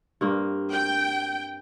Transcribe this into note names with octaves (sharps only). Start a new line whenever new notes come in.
G2 A#3 C4
G5